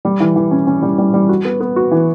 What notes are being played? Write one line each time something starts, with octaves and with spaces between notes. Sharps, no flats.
G3
E3
E3
C#4
C#4
G3
G3
G3
F#4
B3
B3
F#4
E3